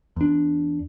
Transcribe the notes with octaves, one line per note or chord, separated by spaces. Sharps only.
E2 D4